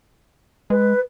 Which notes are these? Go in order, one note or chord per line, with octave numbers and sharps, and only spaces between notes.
G#3 B4